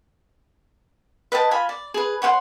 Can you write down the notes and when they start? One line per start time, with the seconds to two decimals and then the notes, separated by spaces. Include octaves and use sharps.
1.32 B4 D#5 G5 A5
1.51 F4 G#5 B5
1.69 D5
1.94 G#4 B4
2.22 C#5 F#5 G5 C6